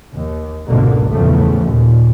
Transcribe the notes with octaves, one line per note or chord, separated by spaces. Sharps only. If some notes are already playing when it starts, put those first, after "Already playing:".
D#2
G#1 C#2 G#2 B2 D3 A#3
A#1 E2 A2 C#3 F3 A3
D#2 A#2